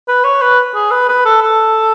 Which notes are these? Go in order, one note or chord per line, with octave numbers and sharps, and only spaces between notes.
B4
C#5
B4
G#4
B4
B4
A4
A4